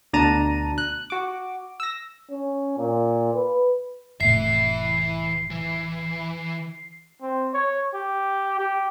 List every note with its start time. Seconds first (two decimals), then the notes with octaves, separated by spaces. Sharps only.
0.13 D2 B2 D4 A5 A#5 D#7
0.78 F#6
1.10 F#4 D6
1.80 E6 A#6
2.30 C#4
2.78 A#2
3.33 B4
4.21 F1 A2 E3 E5 C7
5.50 E3
7.22 C4
7.54 C#5
7.94 G4
8.59 G4